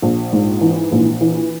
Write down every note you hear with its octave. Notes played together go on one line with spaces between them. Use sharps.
A#1
G#2
E3
A#1
E3